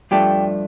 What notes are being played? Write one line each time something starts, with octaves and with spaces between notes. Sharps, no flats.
G2 F3 A3 D4 G4